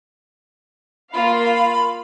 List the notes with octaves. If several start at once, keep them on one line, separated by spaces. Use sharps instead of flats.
A#3 F4 F5 B5